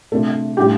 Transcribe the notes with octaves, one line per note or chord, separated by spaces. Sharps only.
C3 A3 D4 F4 A4
A2 G3 D4 F4 G4